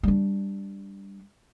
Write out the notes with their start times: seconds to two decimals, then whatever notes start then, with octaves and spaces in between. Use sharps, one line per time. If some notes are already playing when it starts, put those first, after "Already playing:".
0.03 G3 D4